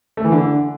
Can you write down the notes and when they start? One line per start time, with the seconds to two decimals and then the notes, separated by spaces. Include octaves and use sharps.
0.17 A3
0.25 E3
0.32 D3